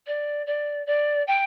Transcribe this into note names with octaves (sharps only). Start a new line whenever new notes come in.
D5
D5
D5
G5